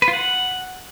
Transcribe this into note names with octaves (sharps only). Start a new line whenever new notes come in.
B4
F4
F#5